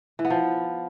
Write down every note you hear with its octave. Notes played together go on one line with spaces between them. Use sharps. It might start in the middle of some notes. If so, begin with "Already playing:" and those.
E3
B3
F3